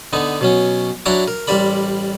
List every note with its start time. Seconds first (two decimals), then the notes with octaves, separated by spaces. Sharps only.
0.13 D3 B3 D#4
0.41 B2 F#3 C#4
1.06 F#3 D4 E4 F#4 A#5 D6
1.28 A#4
1.47 A1 G3 A#4 D5 B5